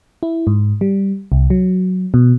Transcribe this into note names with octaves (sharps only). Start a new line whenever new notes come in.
E4
G#2
G3
C2
F#3
B2